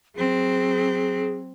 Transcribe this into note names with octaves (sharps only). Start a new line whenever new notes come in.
F#3 C4 G#4